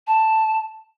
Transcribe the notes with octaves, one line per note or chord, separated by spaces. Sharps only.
A5